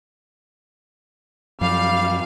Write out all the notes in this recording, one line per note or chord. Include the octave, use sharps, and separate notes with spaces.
F#2 F3 G3 F5